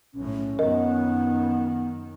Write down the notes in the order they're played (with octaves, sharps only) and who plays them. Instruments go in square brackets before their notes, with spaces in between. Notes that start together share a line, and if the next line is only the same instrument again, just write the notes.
[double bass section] B1 A2 [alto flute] C#4
[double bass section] F#2 D#3 [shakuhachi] B3 [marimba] A#4 D#5